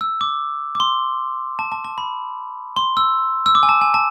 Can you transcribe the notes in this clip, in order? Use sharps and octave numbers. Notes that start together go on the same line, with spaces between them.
E6
D6
D6
C6
A5
A5
A5
B5
C6
E6
E6
D6
G#5
A5
G#5
A5